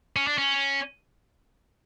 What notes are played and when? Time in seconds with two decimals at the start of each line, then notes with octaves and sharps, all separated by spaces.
0.16 C#4
0.27 D4
0.38 C#4